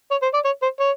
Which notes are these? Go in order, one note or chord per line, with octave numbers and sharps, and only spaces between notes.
C#5
C5
D5
C#5
C5
C#5